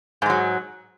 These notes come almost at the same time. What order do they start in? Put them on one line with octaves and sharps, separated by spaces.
G#2 G#3 F#3